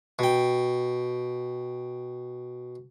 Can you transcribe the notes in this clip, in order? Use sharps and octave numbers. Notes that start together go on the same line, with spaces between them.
B2 G5